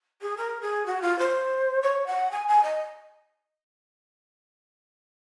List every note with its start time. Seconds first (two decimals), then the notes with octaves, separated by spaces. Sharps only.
0.22 G#4
0.37 A#4
0.61 G#4
0.86 F#4
1.02 F4
1.19 C5
1.82 C#5
2.07 F#5
2.31 G#5
2.48 G#5
2.63 D#5